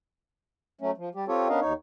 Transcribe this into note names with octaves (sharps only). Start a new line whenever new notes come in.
F#3 A3 C#4
F3
G3 G4
C4 F4 G4 A4 C#5
B3 C#4 D4 A#4 D#5 F5
D#2 D#4 C#5